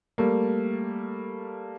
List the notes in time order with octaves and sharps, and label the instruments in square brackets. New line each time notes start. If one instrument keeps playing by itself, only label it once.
[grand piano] G3 A3 A#3